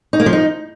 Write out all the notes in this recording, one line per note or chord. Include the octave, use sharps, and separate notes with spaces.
D#4
A#3
F3
D#4